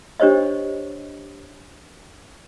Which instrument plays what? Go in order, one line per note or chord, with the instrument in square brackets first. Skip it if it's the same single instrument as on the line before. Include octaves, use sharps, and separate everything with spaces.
[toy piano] D4 G4 C5 C#5 D#5